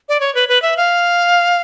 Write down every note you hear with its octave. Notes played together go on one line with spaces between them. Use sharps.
D5
C#5
B4
B4
E5
F5